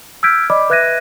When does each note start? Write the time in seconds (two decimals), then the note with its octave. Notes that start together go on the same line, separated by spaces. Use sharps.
0.23 E6 F6 G6 G#6 B6 D7
0.50 D5 D#5 B5 D6
0.70 B4 E5 F#6 G#6 A#6 D#7